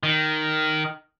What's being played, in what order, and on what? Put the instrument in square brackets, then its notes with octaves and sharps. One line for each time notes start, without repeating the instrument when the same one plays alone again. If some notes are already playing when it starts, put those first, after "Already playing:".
[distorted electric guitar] D#3